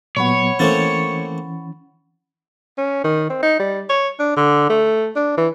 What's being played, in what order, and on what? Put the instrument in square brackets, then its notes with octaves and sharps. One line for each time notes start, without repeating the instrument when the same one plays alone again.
[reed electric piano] A#2 F#3 B3 [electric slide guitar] C#5 [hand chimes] F#5 B5 C#6
[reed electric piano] E3 C#4 A6 [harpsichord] A3 A#3 C4
[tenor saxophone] C#4
D#3
C4
D#4
G3
C#5
D4
D3
A3
D4
E3